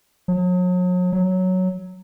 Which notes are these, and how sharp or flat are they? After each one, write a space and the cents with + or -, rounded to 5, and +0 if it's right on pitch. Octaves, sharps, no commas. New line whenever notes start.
F#3 -40
F#3 +0